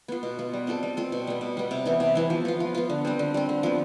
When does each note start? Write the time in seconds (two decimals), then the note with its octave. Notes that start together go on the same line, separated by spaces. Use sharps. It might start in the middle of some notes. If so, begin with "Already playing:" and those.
0.08 B3 F4
0.23 B2
0.39 B3 F4
0.53 G3
0.67 C4 F4 A4
0.83 G3
0.97 C4 F4 A4
1.12 B2
1.27 G3 B3
1.41 B2
1.57 G3 B3
1.71 C3
1.86 E3 B3 E4
2.00 C3
2.15 E3 B3 E4
2.30 F3
2.45 B3 F4
2.60 F3
2.75 B3 F4
2.90 D3
3.05 G3 C4
3.19 D3
3.34 G3 C4
3.49 D3
3.63 F3 B3